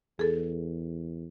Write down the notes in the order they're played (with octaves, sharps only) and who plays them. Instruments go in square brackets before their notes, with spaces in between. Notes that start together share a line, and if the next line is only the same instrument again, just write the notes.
[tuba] E2 [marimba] G#4 A4